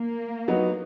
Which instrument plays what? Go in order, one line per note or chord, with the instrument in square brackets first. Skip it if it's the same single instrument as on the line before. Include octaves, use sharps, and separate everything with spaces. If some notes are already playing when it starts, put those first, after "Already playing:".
Already playing: [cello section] A#3
[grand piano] F#3 B3 D#4